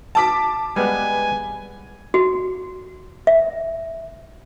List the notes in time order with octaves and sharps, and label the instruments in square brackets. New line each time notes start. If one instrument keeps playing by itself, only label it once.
[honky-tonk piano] A5 D6 B6
[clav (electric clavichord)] G3 G#3 B3 [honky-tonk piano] B4 [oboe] G#5
[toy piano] F#4
E5